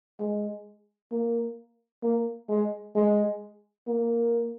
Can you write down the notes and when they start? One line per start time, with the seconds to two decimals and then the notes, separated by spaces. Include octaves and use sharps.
0.20 G#3
1.12 A#3
2.03 A#3
2.49 G#3
2.95 G#3
3.87 A#3